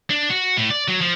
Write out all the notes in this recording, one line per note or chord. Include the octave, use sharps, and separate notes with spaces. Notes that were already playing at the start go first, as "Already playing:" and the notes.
D4
F#4
A2
D5
F#3
F3